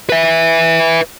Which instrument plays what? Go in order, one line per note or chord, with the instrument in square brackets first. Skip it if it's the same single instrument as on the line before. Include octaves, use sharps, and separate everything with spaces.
[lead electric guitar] B4 E5